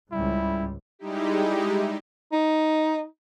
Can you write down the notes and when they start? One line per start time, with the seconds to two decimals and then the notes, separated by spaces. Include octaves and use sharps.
0.12 C#2 G#2 G3 E4
0.99 G3 G#3 D#4 E4 G4
2.32 D#4